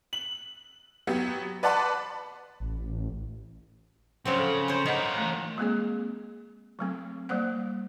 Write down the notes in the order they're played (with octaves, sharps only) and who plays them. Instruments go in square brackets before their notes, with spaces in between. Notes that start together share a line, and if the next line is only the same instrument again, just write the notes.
[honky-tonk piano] F#7
F#3 B3 G4
B4 D5 F#5 A5 B5 C6
[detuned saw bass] A1
[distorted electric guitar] C#3 [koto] F3 F#3 C4
[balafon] A4
[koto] C5 C#5 [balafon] B5
[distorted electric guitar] A#3 F#4 [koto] D#4 [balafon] C5 D#5 F#5
[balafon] E3 A3
G#3 A#3 C4 G#4
F#3 A3 C4
G3 A#3 C5 F#5